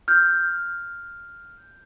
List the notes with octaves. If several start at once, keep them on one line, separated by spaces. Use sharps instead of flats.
F6 G6